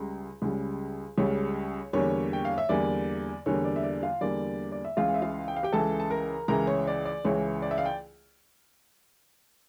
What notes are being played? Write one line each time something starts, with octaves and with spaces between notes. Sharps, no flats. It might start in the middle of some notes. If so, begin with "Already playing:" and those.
Already playing: C#2 C#3 G3 A#5
C#2 C#3 G3
C#2 C#3 G3 C#5
E2 D3 G3 A#3 C#5
G5
F5
E5
E2 D3 G3 A#3 D5
E2 D3 G3 A#3 C#5
D5
E5
D5
F4 F5
E2 D3 G3 A#3 D5
D5
E5
C#2 C#3 E3 F4 F5
E5
F4 F5
G5
F5
G4 G5
C#2 C#3 E3 A4 A5
A5
A#4 A#5
C#2 C#3 E3 A#4 A#5
C#5
D5
D5
C#2 C#3 E3 C#5
D5
E5
F5
G5